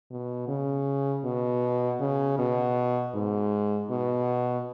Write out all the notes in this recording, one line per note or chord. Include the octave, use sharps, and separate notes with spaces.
B2
C#3
B2
C#3
B2
G#2
B2